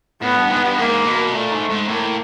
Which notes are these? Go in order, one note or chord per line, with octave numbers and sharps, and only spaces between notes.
A2 B3
G2
G#2
G2
G#2 A#3
B2
A#2 A3
G#2
G#2
A2 A#3